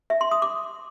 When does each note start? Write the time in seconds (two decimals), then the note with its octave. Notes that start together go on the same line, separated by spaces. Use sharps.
0.10 E5
0.21 C6
0.31 D#6
0.42 D6